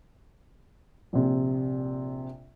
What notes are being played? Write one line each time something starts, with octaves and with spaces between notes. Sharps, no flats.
A#1 C3